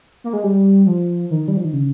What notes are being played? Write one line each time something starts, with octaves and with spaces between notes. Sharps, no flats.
A#3
G#3
G3
F3
D#3
G3
F3
D#3
C#3